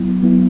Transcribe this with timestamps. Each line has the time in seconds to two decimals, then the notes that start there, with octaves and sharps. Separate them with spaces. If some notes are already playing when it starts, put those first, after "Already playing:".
Already playing: F#3 B3 E4
0.23 F#3 B3 E4